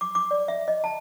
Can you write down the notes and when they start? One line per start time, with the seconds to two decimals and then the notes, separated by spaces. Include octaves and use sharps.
0.01 D6
0.15 D6
0.31 D5
0.48 E5
0.68 D#5
0.84 A5